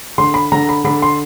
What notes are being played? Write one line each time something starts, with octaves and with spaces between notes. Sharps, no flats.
D3 C6
B5
D3 A#5
B5
D3 B5
C6